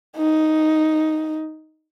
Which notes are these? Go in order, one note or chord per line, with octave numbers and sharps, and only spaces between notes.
D#4